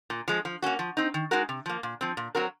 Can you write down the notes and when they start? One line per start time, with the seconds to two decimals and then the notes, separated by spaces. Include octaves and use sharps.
0.10 A#2
0.28 F3 G#3
0.45 F3
0.62 A#3 C#4 F#4
0.79 F3
0.97 C4 D#4
1.14 D#3
1.31 G#3 D#4 F#4 A#4
1.49 C3
1.66 F3 A#3
1.83 A#2
2.01 F3 C4
2.17 A#2
2.35 F#3 C4 F#4 A#4